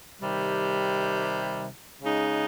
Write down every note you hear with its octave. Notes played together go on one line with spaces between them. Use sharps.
C3 D#3 G3
C#3 G#3 D#4